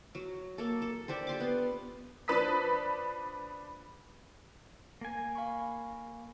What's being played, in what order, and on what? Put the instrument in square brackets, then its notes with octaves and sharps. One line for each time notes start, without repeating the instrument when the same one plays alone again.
[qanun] F#3
A#3 A4
A4
D4 G4 A4 C5
F4 C6 D6
B3
[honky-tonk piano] F3 D4 B4 A5 D#6 B6
[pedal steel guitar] A#3 G#5
[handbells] F5 B5 C#6